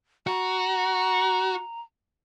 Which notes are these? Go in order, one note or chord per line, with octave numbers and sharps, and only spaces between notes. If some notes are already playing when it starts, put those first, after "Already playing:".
F#4 A#5